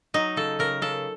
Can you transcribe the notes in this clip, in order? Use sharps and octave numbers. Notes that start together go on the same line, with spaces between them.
F#3 D#4
C#3 A4
C#3 A#4
C#3 A4